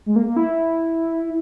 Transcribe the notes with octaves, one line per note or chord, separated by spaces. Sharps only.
G#3
A#3
A#3
E4